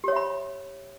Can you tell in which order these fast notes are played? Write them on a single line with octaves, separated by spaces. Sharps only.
G4 C#5 E5 B5